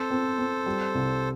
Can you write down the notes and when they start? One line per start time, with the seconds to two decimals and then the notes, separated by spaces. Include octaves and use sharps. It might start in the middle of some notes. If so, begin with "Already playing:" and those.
Already playing: C4 A4 C5
0.10 C4
0.38 C4
0.66 G3
0.95 C2